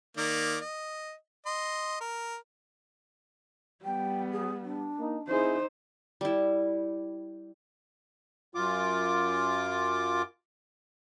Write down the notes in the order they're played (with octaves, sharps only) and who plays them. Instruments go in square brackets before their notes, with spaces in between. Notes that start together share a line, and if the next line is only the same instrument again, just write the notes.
[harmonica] D#3 A#3 D5
D#5
D#5 C6
A#4
[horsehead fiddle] G3 B3 [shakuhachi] G5
[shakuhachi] G#4
D4
[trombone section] A#3 D#4
[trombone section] C4 E4 G#4 [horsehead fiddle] D#4 C5
[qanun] G3 E4
[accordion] F#2 F4 D6